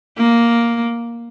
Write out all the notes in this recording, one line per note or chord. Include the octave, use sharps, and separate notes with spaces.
A#3